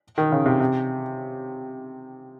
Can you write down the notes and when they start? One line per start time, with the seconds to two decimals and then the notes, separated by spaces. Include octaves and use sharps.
0.18 D#3
0.32 C#3
0.46 C3
0.60 C3